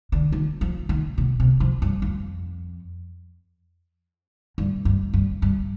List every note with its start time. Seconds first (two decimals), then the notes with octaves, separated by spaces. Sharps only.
0.12 D3
0.32 D#3
0.61 F3
0.89 D#3
1.18 B2
1.40 C3
1.60 F3
1.82 G2
2.02 F2
4.58 G2
4.85 G2
5.14 G2
5.42 G2